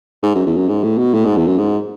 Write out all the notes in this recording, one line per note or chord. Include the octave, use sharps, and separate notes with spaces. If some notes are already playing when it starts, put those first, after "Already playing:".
G#2
F#2
E2
F#2
G#2
A2
B2
A2
G#2
E2
F#2
G#2